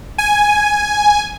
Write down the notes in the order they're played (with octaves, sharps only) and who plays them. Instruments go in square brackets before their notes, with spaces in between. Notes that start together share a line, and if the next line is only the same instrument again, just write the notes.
[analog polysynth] G#5